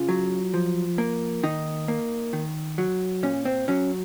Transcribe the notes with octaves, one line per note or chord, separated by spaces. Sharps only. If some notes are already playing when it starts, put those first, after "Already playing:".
Already playing: C#3 F4
F#3
F3
A#3
D#3 D#4
A#3
D#3
F#3
A#2 C#4
C4
F#3 C#4